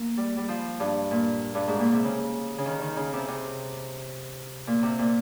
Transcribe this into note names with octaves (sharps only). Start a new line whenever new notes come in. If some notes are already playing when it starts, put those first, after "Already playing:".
Already playing: A#3
G3
G3
F3
G2
A#2
G2
G#2
A#2
C3
C#3
C#3
D#3
D#3
C#3
C3
C3
A#2
C3
A#2